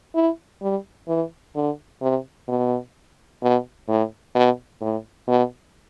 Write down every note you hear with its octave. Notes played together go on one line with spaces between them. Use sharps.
E4
G3
E3
D3
C3
B2
B2
A2
B2
A2
B2